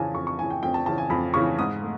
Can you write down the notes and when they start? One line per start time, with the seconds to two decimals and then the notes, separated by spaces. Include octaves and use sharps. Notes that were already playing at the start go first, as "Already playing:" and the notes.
Already playing: F2 C#3 E3 G#5 A5
0.15 F2 C#6
0.27 C#6
0.39 C#3 E3 G#5
0.50 G5
0.63 F2 G5
0.74 A5
0.86 C#3 E3 A5
0.98 G#5
1.10 F2 B5
1.34 C#3 E3 C#6
1.59 G#2 D#6
1.82 A3